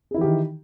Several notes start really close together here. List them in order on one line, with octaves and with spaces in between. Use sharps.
G#4 E4 E3 G4 D#3